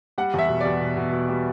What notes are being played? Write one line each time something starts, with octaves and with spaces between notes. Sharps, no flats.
G3 F#5
E2 E5
B2
E2 D5
B2
B2
B2
G3